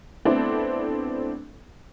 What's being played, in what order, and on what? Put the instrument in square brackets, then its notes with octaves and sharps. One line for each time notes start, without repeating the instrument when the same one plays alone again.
[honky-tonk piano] A3 B3 C4 D4 E4 A4